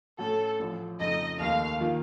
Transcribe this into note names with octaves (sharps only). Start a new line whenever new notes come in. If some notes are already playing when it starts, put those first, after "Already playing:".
A2 A3 C#4 F#4 A4
A1 A2 F3
F2 C#3 A3 D#4 D#5
D#2 D#3 A3 F5
D#3 A#3 F4